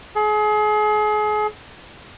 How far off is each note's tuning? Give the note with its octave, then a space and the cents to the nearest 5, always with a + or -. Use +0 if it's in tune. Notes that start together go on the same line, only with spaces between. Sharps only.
G#4 +35